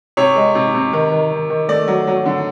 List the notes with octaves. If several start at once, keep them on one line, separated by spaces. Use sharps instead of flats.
C3 C#5
G#3
C3
C3
D#3
D#3
D#3
D#3
A3 D5
F#3
F#3
D3